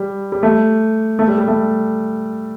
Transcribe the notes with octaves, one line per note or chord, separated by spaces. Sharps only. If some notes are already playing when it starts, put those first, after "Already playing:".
Already playing: G3
G3
A3
A3
G3
G3
A3